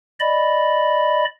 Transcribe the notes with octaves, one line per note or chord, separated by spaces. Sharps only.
D5 D#5 B5